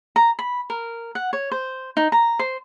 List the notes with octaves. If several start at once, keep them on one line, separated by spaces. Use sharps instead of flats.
A#5
B5
A#4
F#5
C#5
C5
D#4
A#5
C5